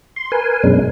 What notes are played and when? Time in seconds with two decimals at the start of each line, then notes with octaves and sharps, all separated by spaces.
0.16 C6
0.32 A#4 B4 G#5
0.64 F#2 B2 G#3 C#4 D4